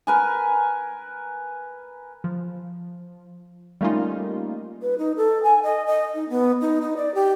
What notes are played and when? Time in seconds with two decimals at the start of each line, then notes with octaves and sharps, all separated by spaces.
0.07 A#4 B4 G#5
2.24 F3
3.81 G3 A3 A#3 C#4 D#4 F4
4.82 B4
4.98 D#4
5.17 A4
5.43 G#5
5.63 D#5
5.87 D#5
6.15 D#4
6.29 B3
6.61 D#4
6.81 D#4
6.97 D5
7.15 G4